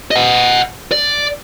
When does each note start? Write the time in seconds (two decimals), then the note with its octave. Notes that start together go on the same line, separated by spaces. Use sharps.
0.11 D#5 F#5
0.92 D5